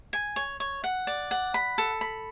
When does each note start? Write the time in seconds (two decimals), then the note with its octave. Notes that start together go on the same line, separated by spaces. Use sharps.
0.13 G#5
0.36 C#5
0.60 C#5
0.84 F#5
1.07 D5
1.31 F#5
1.54 B5
1.78 A4
2.01 B5